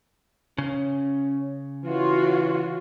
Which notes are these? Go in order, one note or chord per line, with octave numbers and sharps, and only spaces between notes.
C#3 C#4
E3 F4 F#4 C#5